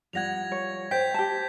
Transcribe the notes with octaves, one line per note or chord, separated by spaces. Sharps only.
F3 G3 F#5 G#6 A#6 F7
C#5
C5 G5 G6 B6
G4 A5